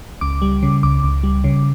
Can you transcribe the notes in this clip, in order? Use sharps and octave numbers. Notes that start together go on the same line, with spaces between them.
C#2 D6
G3
C#3
C#2 D6
C#2
G3
C#3